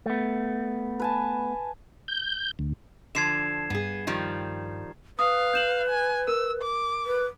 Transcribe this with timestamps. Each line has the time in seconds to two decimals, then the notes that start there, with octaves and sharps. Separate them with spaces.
0.06 A3 B3
1.00 B4 G#5 A5
2.08 G6
2.59 D2
3.15 D3 F3 G#6 C7 E7
3.70 G2 B3 G#4
4.07 D#3 F3 G3
5.19 B4 F5 D#6
5.53 G6 E7 F#7
5.90 G#5
6.28 A#4 E6
6.62 D6
7.06 B4